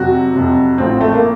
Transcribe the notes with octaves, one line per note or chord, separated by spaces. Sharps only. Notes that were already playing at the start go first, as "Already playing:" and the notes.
Already playing: F2 C3 F#3 F#4
F2 C3 F#3
A1 A2 F3 C4
A3
A#3